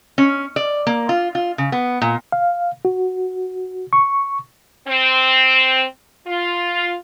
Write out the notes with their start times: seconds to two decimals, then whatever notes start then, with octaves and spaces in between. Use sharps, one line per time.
0.18 C#4
0.56 D5
0.87 A#3
1.09 F4
1.35 F4
1.58 C#3
1.72 B3
2.02 A#2
2.32 F5
2.85 F#4
3.93 C#6
4.87 C4
6.26 F4